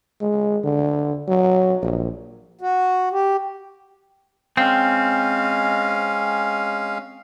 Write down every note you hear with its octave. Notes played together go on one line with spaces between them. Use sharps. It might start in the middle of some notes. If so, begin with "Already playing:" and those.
G#3
D3
F#3
A#1
F#4
G4
G#3 C4 C#4 F5